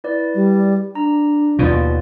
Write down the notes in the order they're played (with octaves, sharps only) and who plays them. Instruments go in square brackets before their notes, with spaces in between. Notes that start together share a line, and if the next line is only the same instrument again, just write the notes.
[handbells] E4 B4 D5
[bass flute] G3
[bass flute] D4 [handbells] A#5
[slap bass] D#2 B2 [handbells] F4 B4 D5